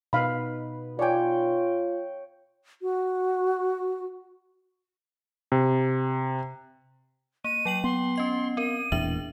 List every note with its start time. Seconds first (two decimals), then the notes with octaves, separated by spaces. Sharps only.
0.13 B2 D#4 B4 F5 B5
0.99 F4 C#5 D5 G5 G#5
2.82 F#4
5.52 C3
7.44 A#3 D#7
7.65 F#3 G5 F#7
7.84 B3 C6
8.16 C#4 D#5 C7
8.57 C4 A#4 D#7
8.92 E1 E2 A#2 D4 E5 F#7